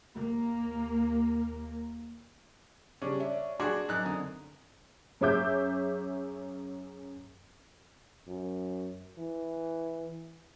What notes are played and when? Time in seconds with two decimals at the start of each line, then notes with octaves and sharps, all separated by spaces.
0.16 D#2 A#3
3.01 C#3 G3 C#4 D4
3.20 C#5 D5 E5
3.60 D4 F#4 G#4 C6 D6 G#6
3.89 F#2 D#4 F#6
4.05 F2 D3 D#6
5.21 F#2 C#4 G#4 E5 D6 G6
8.27 F#2
9.18 E3